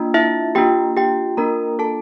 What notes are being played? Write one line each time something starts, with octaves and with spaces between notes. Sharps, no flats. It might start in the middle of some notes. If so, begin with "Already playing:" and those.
Already playing: A#3 D4 F4
E4 E5
A#3 D4 F4 G4 G5
G4 G5
A#3 D4 F4 A#4 A#5
A4 A5